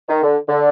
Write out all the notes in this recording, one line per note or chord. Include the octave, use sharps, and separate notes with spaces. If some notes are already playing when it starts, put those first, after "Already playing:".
D#3
D3
D3